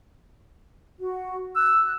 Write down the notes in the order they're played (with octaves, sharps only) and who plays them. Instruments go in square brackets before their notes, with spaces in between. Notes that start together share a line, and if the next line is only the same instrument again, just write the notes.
[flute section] F#4
[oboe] E6 [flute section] F#6